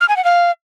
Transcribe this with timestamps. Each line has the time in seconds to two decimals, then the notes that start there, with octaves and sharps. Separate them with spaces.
0.01 F6
0.09 G#5
0.17 F#5
0.25 F5